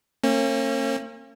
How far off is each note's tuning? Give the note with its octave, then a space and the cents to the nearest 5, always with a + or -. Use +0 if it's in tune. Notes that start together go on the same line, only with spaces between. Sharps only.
A#3 -40 C#4 -40